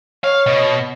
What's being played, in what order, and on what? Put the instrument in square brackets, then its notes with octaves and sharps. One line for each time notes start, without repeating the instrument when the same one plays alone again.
[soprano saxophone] C#5 [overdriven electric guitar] F5
[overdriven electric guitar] B2